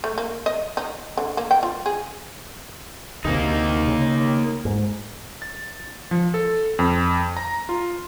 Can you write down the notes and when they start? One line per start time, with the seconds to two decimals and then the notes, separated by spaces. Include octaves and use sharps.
0.04 A3
0.18 A#3
0.46 D#5
0.77 D#4
1.17 D3
1.37 A#3
1.51 G5
1.63 F4
1.86 G#4
3.25 D2 C3 A#3 D#4
3.88 C#3
4.65 G#2
5.42 A6
6.11 F3
6.34 A4
6.79 F2
7.37 A#5
7.69 F4